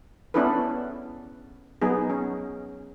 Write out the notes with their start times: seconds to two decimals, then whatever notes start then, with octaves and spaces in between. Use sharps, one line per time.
0.34 B3 C#4 D4 E4 A4 B4
1.82 F#3 B3 D#4 G#4
2.10 C#4